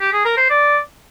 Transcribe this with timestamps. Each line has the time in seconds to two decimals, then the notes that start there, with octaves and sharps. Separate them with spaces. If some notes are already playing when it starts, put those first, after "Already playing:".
0.01 G4
0.13 G#4
0.25 A#4
0.37 C5
0.50 D5